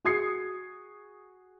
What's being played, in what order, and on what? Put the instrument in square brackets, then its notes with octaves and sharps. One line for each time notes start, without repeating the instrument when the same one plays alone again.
[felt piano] F#4 G#4 D#6 G#6 C7 C#7